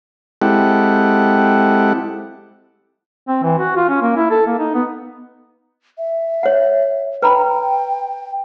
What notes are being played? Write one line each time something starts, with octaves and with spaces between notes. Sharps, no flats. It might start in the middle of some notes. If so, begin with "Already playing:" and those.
G#3 C4 E4 G4 A4 F#5
C4
E3
F#4
F4
C#4
A#3
E4
A4
A#3
D#4
B3
E5
C#5 F#5
B4 G5 A#5 B5